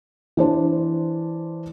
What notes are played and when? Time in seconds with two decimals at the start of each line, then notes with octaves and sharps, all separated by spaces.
0.37 E3 D4 C5